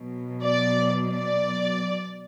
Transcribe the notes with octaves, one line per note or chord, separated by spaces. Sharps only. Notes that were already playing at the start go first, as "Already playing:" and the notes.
Already playing: B2 F#3
D5
D5